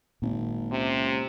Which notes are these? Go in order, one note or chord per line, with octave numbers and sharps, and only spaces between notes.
G#1 A#2
C#2 C3